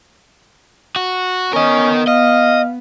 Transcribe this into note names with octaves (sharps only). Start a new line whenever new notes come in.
F#4
B3 C#4 A#4 D#5
D#5 F5